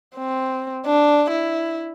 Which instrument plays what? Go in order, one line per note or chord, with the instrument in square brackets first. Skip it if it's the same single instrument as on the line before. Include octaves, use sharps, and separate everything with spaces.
[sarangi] C4
D4
E4